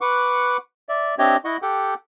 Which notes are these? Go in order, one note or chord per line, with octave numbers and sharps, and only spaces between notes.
B4 F#5 C#6 D6
D5 E5
C4 D4 G4 C#5 D#5 E5
E4 D#5 F#5 C#6
G4 A4 F#5 G5